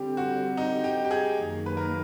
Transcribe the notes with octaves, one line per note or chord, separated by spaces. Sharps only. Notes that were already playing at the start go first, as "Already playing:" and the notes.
Already playing: D3 G3 C4 G4
F#4
D#4
G4
G4
G#4
F#2 D#3 F#3 A#3
B4
A#4